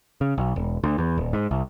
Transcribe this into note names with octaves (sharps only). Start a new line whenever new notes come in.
C#3
B1
E1
D2
E2
D#1
G#2
C2